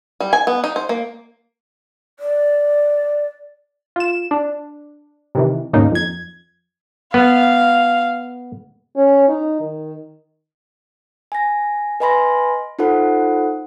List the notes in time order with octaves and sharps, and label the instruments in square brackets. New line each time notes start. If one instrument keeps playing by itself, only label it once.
[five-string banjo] G3
G#5
B3
D#4
C5
A#3
[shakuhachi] D5
[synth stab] F4 E7
D4
C3 D#3 E3
D#2 G#2 C#3 A#3 D#4
F2 G#6
[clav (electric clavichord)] B3 [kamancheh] F5
[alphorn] C#4
D#4
D#3
[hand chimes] G#5 A#6
B4 D#5 G#5 B5 C6 A#6
D#4 F4 A4 C5 F#5